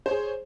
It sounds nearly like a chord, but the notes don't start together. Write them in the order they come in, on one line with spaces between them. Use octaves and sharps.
C5 C#5 G#4